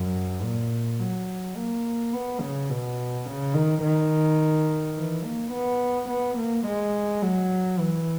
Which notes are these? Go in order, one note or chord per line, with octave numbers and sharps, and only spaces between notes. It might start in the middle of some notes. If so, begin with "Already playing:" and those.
Already playing: F#2
A#2
F#3
A#3
B3
C#3
B2
C#3
D#3
D#3
E3
A#3
B3
B3
A#3
G#3
F#3
E3